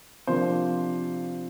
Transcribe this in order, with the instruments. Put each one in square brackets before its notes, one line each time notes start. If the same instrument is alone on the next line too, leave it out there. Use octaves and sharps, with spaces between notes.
[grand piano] C3 F3 A#3 D4 C5